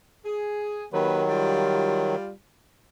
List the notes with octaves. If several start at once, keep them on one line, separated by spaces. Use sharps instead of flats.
G#4
D#3 F#3 A#3 G4 B4
G3 F4